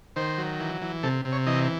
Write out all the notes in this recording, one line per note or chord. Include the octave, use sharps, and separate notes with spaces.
D#3 C5
F#3
E3
E3
C3 A4
C3
C#5
E3 D#5